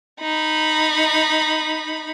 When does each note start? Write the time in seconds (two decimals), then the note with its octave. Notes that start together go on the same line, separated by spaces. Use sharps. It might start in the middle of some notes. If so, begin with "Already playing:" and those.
0.21 D#4 B5